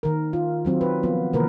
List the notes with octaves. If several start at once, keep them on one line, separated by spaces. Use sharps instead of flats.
D#3 A#4
F4
D#3 F#3 C4
B4
F3 B3 F4
C3 D#3 E3 A#3 A#4 B4